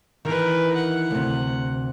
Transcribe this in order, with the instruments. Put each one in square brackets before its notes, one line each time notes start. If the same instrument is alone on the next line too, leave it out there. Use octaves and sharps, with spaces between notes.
[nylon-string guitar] D#3 E3 [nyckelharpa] A#4 B4
[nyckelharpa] F#5
[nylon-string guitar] D2 C3